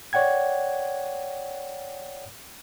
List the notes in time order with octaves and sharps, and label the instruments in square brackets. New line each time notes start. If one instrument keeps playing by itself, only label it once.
[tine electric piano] C#5 D5 F#5 G5 G#6